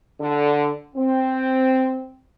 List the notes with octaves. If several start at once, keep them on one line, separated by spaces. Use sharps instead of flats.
D3
C4